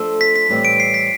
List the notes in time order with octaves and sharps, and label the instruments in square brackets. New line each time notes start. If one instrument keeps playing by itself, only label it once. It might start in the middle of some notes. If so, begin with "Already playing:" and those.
Already playing: [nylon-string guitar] F3 A3 D4 A4
[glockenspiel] B6
B6
[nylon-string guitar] A2 E3 G3 C4 G4
[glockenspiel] D7
C7
B6